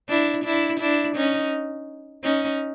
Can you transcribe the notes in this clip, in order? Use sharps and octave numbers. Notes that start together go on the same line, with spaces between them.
D4 E4
D4 E4
D4 E4
C#4 D#4
C#4 D#4